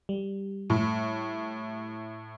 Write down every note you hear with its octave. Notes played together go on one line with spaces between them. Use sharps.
G3
A2